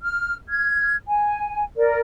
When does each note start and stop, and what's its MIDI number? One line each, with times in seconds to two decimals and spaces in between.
0.02 0.35 89
0.48 0.96 89
0.48 0.96 92
1.07 1.64 80
1.77 1.99 70
1.77 1.99 74